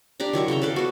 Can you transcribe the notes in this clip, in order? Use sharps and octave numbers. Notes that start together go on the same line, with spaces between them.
D4 G4 D5 A#5
D#3 F#3 E4 C#6
C#3 E5 G5 A#5
A4 B4 D5 F5
B3 F#4